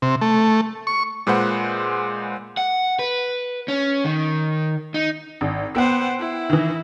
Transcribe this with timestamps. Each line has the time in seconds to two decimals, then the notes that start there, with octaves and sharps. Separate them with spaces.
0.02 C3
0.21 A3
0.87 C#6
1.27 A#2 G#3 B4 C5 F#5
2.57 F#5
2.99 B4
3.68 C#4
4.05 D#3
4.94 D#4
5.41 G#1
5.75 B3 C5 F#5 G5 E6
6.19 E4
6.50 D#3 E3